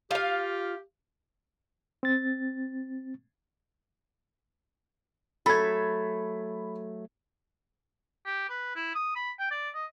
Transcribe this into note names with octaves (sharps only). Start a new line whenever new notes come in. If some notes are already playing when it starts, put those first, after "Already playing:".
F4 G4 F5
C4 A6
F#3 A3 A4 B5 G#6
G4
B4
E4
D#6
B5
G5
D5
D#5